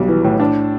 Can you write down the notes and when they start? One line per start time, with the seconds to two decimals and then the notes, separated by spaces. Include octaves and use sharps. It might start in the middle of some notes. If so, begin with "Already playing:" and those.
Already playing: B1 G3
0.08 E3
0.24 A2
0.40 D4